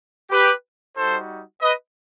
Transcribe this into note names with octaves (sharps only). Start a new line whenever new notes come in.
G4 B4
G3 D#4 F#4 A4 C5
B4 D#5